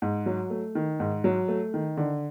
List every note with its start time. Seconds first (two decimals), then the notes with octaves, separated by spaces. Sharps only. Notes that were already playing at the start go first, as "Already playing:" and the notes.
0.02 G#2
0.26 F#3
0.50 A3
0.75 D#3
1.00 G#2
1.24 F#3
1.48 A3
1.74 D#3
1.97 D3